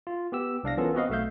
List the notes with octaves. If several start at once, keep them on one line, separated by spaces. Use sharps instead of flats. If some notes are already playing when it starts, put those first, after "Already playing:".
F4
B3 G4 E6
C2 D4 F5 A#6
E3 B3 C#4 F4 A4 A#4
B3 C4 F#4 B4 D#5 F5
B1 A3 E5 F5 G6